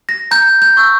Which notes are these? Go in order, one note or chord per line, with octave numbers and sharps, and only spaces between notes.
A#6
A#5 G6
G6
C#6 E6 G6